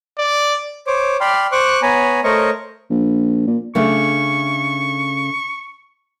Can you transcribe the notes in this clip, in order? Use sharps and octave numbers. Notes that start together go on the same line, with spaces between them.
D5
C5 C#5 D6
D5 G5 B5 C6 F6
C5 C#6 D6 F#6
B3 C#5 G#5 A#5 B5
A3 A#4 C5 C#5 D#5 C#6
A#1
A#2
C#3 A3 D4 C#6